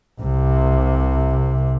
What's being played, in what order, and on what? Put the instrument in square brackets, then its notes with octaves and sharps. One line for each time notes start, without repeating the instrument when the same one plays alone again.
[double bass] C2 C3